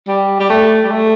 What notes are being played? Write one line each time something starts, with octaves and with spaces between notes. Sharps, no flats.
G3
G3
A3
G3
A3